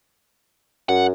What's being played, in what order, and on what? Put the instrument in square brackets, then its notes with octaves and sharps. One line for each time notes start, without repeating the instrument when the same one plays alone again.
[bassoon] F#2 [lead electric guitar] F#5